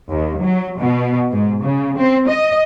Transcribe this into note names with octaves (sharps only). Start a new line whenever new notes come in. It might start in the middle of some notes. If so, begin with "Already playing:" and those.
D#2
F#3
B2
G#2
C#3
C4
D#5